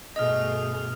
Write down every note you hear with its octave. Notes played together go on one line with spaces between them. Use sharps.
G2 B2 A3 G#4 D#5 D#6 F6